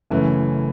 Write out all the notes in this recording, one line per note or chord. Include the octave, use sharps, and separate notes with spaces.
F#1 F#2 E3 A3 C#4